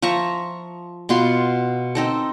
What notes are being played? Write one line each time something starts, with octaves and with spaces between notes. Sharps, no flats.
F3 E5 A#5 C#6
B2 B3 F4 C6
C4 D#4 A4